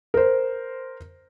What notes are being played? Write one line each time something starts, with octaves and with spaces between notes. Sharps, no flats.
A#4 C5